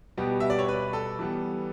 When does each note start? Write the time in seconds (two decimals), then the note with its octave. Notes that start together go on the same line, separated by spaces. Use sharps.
0.17 B2 G3 B3 G4
0.40 E5
0.50 D5
0.59 C#5
0.69 B4
0.93 A4
1.19 E3 G3 B3